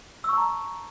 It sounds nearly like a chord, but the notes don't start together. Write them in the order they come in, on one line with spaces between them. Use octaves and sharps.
E6 C#6 A5 A#5